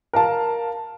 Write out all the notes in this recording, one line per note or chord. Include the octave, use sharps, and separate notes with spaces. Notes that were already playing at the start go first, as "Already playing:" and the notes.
A#4 F5 A5